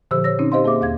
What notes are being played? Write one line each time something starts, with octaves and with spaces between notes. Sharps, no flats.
A#2 D3 F3 G4 C5 E6
C#5 E6 A#6
D3 C4 C#4 D#4
G4 C5 D#5 F5 C6
A#3 G#4 E5 D6
D#2 F5 G#6